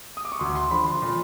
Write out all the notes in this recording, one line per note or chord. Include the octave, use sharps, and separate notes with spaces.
D#6
D6
C#6
D2 C6
C6
D3 F3 B5
C6
A#2